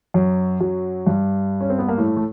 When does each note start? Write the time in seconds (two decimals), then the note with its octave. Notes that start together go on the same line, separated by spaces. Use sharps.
0.14 F#2 F#3
0.61 F#2 F#3
1.07 G2 G3
1.61 C#4
1.70 C4
1.79 B3
1.88 A#3
1.98 A2 A3
2.17 A3